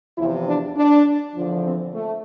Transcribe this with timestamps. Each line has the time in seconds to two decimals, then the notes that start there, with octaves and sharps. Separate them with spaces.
0.16 E2 C3 F3 E4
0.47 D4
0.76 D4
1.34 E2 D3 F3
1.63 C4
1.94 A3